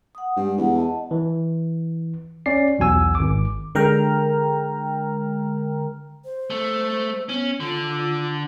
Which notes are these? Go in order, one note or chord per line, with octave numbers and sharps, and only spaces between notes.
F#5 D#6
G2 G#3 G4
E2 F#5
D#5 A5
E3
C#4 D5 C7
B1 E2 F#4 G#5 E6
G#1 D6
D3 G#3 A#4 G5 A#5 F6
C5
A3
B3 C#4
D3 F4